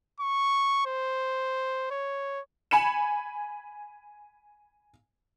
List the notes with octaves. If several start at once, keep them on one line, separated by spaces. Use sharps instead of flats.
C#6
C5
C#5
G#5 B5 C#7 E7